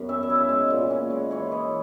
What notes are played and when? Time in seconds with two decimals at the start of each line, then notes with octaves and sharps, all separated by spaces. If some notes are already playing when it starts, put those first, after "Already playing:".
Already playing: F#2 B3
0.09 C#4 E5
0.23 E5
0.30 E4
0.35 E5
0.49 G#3
0.70 A#2
0.90 C#4
1.10 G#3
1.31 E3 C#5
1.52 E3 D#5